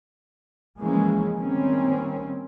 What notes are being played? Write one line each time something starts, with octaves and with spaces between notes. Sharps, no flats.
C#3 E3 F3 G#3 A#3 C#4
D#3 G3 A#3 C4 C#4